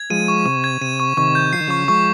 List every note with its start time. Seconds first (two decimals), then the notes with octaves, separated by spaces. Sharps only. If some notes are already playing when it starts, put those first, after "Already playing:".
Already playing: G#6
0.10 F3 G#3 D#7
0.28 C#6
0.45 C3 C#6
0.64 G#6
0.81 C3 D#7
1.00 C#6
1.17 C3 D#3 C#6
1.35 G6
1.53 F3 C7
1.60 D#3
1.67 C#3 F3 C#6
1.88 F3 G#3 C#6